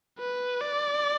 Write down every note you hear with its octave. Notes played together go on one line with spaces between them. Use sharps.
B4
D5